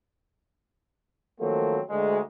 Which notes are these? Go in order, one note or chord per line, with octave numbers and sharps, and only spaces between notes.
D#3 F3 F#3 A3 A#3 C4
D2 G#3